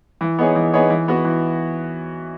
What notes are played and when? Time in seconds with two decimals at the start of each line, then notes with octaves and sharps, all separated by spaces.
0.21 E3
0.39 B3 D#4 G#4 C#5
0.55 E3
0.73 B3 D#4 G#4 C#5
0.90 E3
1.08 B3 F#4
1.25 E3